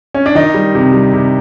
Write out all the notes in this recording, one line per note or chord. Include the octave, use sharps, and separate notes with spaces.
C#4
D4
D#3 D#4
G3
C3
G3
C3